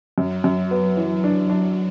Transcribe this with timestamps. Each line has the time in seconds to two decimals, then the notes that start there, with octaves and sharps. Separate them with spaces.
0.18 F#2 F#3
0.44 F#2
0.71 B3
0.97 E3
1.24 D4
1.50 D4